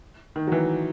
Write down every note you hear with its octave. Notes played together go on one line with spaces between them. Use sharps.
D#3
F#3
E3